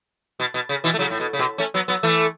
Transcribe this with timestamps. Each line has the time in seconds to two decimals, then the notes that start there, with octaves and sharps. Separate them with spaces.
0.40 B2
0.54 B2
0.69 C#3
0.84 B2 E3
0.94 A3
0.99 C#3 F#3
1.10 A2
1.20 B2
1.33 C#3
1.39 B2
1.58 A3 C#4
1.74 F#3 B3
1.88 F#3 B3
2.03 E3 A3